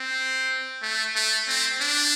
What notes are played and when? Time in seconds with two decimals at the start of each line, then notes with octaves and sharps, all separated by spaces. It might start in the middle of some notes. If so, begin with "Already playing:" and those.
Already playing: C4
0.83 A3
1.15 A3
1.48 C4
1.81 D4